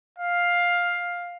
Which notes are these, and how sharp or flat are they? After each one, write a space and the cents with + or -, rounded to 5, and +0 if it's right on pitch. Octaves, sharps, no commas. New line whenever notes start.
F5 +10